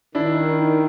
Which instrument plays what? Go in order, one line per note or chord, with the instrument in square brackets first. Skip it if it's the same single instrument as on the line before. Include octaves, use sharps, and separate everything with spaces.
[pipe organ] D#3 [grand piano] D4 E4